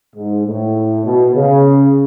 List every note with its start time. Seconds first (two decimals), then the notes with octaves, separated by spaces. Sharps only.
0.16 G#2
0.47 A2
1.06 B2
1.36 C#3